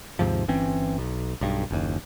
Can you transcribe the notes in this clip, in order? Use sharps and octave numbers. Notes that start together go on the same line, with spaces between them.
D#2 G#2 C3 F3
G1 E3 C4 C#4
B1
B1 G2
F#1 D#2